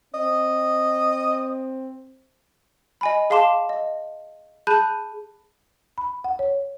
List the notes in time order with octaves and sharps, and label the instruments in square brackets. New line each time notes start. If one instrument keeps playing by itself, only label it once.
[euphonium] C4 [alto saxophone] D#5
[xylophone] D#5 G#5 B5
G#4 F5 A5 C6 D6 E7
D#5
G#4 A5 B5 F#6 G6 D#7
[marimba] B5
F#5
C#5